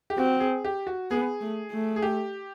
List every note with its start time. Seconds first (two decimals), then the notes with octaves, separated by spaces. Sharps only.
0.10 G4
0.18 C4 F#4
0.40 G#4
0.65 G4
0.87 F#4
1.10 B3 G#4
1.41 A3
1.72 A3
1.96 G#4
2.02 G4